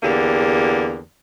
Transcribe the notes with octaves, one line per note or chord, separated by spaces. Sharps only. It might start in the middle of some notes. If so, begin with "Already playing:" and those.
E2 D3 A#3 G4